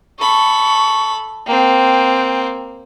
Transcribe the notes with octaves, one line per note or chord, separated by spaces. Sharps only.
A4 B5 C#6
A#3 C4 G5